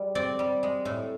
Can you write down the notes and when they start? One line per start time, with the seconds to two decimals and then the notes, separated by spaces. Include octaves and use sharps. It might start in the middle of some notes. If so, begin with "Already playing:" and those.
Already playing: G3 G#3
0.15 C4 D5
0.39 G3
0.63 G#3
0.85 A2